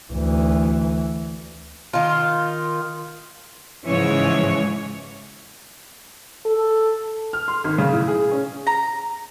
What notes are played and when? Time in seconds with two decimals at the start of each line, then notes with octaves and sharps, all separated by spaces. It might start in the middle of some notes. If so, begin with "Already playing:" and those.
0.13 D2 E3
1.93 D#3 F4
3.86 G#2 C#3 E3 F3 G#3 C#5
6.46 A4
7.33 F6
7.48 C6
7.64 G#1
7.78 C#3
7.93 A2
8.08 G#4
8.31 C#4
8.67 A#5